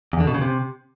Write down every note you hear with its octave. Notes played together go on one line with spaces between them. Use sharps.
E2
D3
B2
C#3
C3